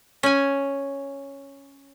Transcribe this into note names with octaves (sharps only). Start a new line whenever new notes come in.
C#4 G#5